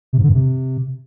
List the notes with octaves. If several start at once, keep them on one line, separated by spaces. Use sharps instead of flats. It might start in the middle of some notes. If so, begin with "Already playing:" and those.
C3
G#2
D3
G2
C3